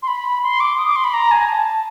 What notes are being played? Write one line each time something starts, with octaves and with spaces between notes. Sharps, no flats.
C6
B5
C6
D6
D#6
D6
C6
B5
A#5
G#5
A5